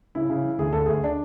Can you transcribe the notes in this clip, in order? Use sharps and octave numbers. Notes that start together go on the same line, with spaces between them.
C#3 E4
C#3
E3
D2 G#4
D2 A4
D2 G#4
D4